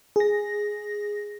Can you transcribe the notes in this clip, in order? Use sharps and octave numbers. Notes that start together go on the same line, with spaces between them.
G#4 A#6